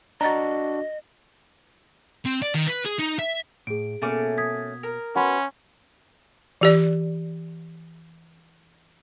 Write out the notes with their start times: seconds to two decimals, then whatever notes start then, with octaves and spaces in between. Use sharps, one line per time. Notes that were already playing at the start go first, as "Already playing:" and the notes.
0.21 D4 F#4 D#5 A#5 A6
2.26 C4
2.42 D5
2.54 D#3
2.67 B4
2.86 G#4
2.99 D#4
3.19 E5
3.67 A2 G#4 D7
4.02 B2 A3 A#3 C#4 D6
4.38 D#6 G#6 B6
4.83 A#4
5.16 C#4 F#4 B4 F#5 B5 C6
6.61 E3 G4 D5